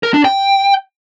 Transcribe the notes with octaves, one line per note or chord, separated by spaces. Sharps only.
A#4
D4
G5